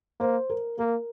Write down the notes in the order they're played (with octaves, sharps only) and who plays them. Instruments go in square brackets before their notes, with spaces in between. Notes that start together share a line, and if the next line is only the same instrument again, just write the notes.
[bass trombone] A#3 [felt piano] C5
[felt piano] A#4
[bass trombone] A#3 [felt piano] A#4